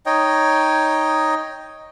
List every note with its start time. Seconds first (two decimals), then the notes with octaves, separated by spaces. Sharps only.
0.06 D#4 C#5 D#5 G5